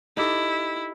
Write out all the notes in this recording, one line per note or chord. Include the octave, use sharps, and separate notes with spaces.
D#4 E4 G4 A4